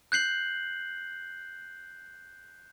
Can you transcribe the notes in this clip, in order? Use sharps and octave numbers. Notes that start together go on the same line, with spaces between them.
F#6 G6 C7 F#7